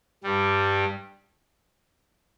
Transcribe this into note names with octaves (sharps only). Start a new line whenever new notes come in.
G2 G3